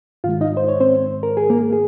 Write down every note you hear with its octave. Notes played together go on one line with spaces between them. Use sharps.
G#2 D#3 G#3 F4 F5
D#4 D#5
C5
C#5
C4 C5
A#4
G#4
A#3 A#4
G#4